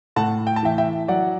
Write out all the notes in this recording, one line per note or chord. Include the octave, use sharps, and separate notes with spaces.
A2 F#5 A5
G5
A5
E3 E5 G5
E5 G5
F#3 D5 F#5